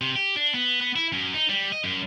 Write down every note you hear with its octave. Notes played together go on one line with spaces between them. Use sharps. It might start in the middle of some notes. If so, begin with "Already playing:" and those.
C3
G4
D4
B3
B3
E4
F#2
D#4
G3
D#5
F#2